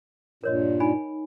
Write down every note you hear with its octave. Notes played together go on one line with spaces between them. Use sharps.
G2 A#2 A#4 C#5 D#5
D#4 G#5 B5